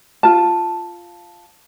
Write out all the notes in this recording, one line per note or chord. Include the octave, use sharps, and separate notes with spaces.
F4 A5